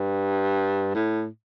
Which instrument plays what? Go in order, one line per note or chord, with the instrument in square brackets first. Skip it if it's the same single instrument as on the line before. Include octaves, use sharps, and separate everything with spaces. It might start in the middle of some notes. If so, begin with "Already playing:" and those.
Already playing: [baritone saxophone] G2
A2